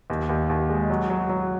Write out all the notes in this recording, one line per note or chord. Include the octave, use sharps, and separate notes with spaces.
D#2
D#2
D#2
G#3
F#3
F#3
F#3